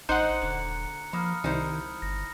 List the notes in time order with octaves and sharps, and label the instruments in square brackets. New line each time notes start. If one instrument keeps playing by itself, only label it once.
[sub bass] A1 [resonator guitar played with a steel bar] D#4 [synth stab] C5 F#5 [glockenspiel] A#5 F#6 C#7
[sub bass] D#1 [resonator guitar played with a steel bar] D3
[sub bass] F3 [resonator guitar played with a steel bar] A#3 [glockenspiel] B5 D#6 F6
[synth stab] C2 [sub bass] D#3 [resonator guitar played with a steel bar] D#4 E4 C5
[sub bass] G1 [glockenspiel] A#6